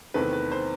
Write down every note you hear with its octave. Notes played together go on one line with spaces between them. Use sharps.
E2 C3 D#3 A3 B4
B4
C5